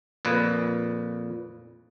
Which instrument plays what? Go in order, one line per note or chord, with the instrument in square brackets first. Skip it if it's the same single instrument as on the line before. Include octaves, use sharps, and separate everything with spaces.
[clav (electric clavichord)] F2 A#2 B4